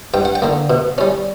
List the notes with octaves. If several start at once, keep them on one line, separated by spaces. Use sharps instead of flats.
G2 G5
F#5
G5
D3 A#3
B2
G3 C#4